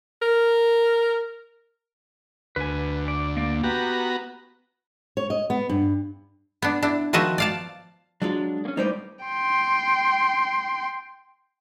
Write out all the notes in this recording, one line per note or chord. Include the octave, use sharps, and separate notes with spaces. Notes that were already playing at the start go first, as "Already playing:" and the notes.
A#4
D2 B4 G#5
D5
A#3 D5
B3 F#4 G4 A#5
C#5
D#5
B3
G2
B3 D4
D4 E4
D#3 F3 F#4 B4 D#5 E5
D5 F5 A5
F#3 G#3 D4 F4
A#3 C#4
A2 G3 D#4 B4 C5 D5
G5 C6